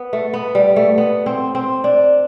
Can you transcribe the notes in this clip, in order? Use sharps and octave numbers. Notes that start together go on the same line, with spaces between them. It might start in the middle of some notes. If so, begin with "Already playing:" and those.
Already playing: B3
A3
B3
G3
A3
B3
C4
C4
D4